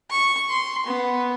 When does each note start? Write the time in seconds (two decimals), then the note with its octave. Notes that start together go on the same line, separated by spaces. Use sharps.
0.11 C#6
0.50 C6
0.86 B3